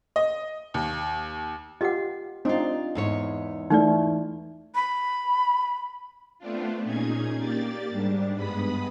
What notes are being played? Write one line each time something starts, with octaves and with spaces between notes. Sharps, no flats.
D#5
D#2
F4 G4 D#5 F#5
C4 D4 D#4 F4
E2 G#2 C#5
E3 A3 D#4 D5
B5
A3 B3 C4 D4 F4
A#2 C#4 D#4 G#4 G#6
A#3 G4 D5 A6
G#2 G3 D4
G2 G#3 B3 B4 B5 D#6